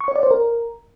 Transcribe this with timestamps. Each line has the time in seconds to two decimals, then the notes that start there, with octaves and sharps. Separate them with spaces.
0.01 C#6
0.08 C#5
0.16 D5
0.23 C5
0.31 A#4